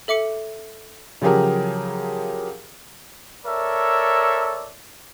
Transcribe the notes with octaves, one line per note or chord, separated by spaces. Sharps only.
A4 E5 D6 C#7
C#3 F3 F#3 G4 G#4 A#4
A4 A#4 C#5 D5 E5